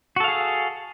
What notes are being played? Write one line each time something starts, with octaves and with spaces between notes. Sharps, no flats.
F#4 G#4 A4 F5